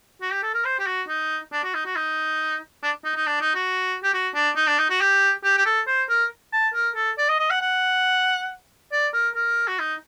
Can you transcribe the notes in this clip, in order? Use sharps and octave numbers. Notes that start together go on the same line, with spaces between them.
F#4
G4
A4
A#4
C5
G4
F#4
D#4
D4
F#4
D#4
F#4
D#4
D4
D#4
D#4
D4
D#4
F#4
G4
F#4
D4
D#4
D4
D#4
F#4
G4
G4
G4
A4
C5
A#4
A5
A#4
A4
D5
D#5
D#5
F#5
F#5
D5
A#4
A#4
F#4
D#4